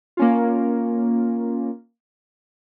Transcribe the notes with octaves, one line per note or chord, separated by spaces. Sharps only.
A#3 C#4 F4